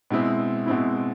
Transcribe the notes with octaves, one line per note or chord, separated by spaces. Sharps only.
B2 G#3 C4 E4
B2 G#3 C4 E4